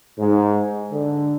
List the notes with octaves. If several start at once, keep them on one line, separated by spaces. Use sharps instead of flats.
G#2
D3